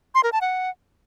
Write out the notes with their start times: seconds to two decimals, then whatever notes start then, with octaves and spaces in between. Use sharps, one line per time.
0.15 C6
0.24 A#4
0.32 A5
0.41 F#5